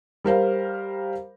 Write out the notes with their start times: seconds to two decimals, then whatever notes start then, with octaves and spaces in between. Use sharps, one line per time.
0.24 G3 A#4 C5 F5